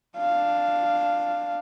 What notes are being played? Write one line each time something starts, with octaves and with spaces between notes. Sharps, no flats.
D4 F5